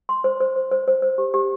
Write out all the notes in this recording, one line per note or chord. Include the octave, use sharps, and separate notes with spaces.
C6
C5
C5
C5
C5
C5
C5
G4
G4